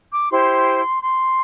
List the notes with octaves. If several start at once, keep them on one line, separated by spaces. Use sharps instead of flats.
D6
E4 G4 C5 C6
C6